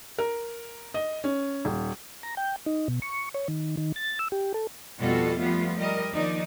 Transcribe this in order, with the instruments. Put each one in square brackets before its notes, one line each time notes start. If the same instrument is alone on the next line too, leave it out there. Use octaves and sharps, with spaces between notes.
[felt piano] A#4
D#5
C#4
D#1
[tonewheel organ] A#5
G5
D#4
B2
C#6
C#5
D#3
D#3
A6
E6
G4
A4
[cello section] F2 B2 G3 F4 F#4 A4
F3 G3 A3 B3 F4
G3 A#4 D#5
D#2 F3 D4 D#4 D5